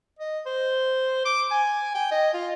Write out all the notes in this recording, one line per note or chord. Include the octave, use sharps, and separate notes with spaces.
D#5
C5
D6
G#5
G5
D#5
F4